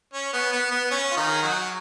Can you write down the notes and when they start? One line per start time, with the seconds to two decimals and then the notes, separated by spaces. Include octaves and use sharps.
0.13 C#4
0.33 B3
0.52 B3
0.71 B3
0.91 C#4
1.11 F4
1.17 D#3 D#4
1.33 G#4
1.43 F#3 F#4